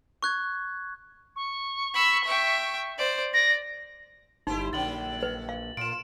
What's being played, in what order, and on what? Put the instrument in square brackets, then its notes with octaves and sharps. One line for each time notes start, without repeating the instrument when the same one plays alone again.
[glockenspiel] C#6 F#6 G#6
[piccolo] C#6
[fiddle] B5 E6
E5 G5
C5 D5
[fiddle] D5 [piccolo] A#6
[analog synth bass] G1 [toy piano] D#4 [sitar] E4 G4 C5
[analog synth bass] A#1 [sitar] D3 F#3 [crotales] A6 F#7
[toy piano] B4
F5
[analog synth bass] A#2 [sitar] F4 [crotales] D7 E7